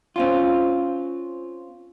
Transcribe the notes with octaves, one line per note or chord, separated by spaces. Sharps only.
C4 C#4 F4